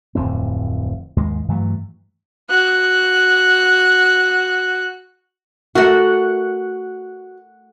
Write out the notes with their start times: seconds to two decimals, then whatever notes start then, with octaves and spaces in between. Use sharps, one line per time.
0.15 D1 F2 A2 C4
1.16 D#2 G#2 G#3
1.48 G2 E3 F#3 A3
2.50 F#4 F#6
5.75 A3 F#4 A#4 F#5